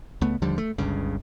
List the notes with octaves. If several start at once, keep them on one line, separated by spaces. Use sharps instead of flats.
C#2 A3 B3
D#2 D3 F3 G3
A3
G1 C#2 G2 C#3